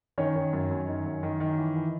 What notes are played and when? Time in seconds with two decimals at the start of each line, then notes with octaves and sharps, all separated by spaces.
0.18 D#3 C#4 C#5
0.35 D#3
0.53 F#2
0.71 F#2
0.88 D#3
1.06 F#2
1.23 D#3
1.40 D#3
1.58 E3
1.76 E3